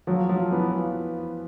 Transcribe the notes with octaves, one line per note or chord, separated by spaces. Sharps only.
F3 F#3
F3
E3 B3
F3